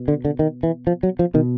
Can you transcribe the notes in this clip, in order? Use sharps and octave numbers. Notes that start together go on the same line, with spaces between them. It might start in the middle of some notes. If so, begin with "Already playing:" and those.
Already playing: B2
D3
D3
D#3
E3
F3
F#3
F3
B2 D#3